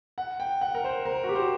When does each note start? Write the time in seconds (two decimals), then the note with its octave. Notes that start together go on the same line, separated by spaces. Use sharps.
0.18 F#5
0.40 G5
0.61 F#5
0.75 A#4
0.84 C5
1.05 A#4
1.24 F#4
1.29 G4
1.35 C5